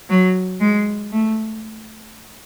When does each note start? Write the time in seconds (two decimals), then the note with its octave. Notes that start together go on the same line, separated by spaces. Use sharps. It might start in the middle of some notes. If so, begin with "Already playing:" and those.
0.10 F#3
0.60 G#3
1.12 A3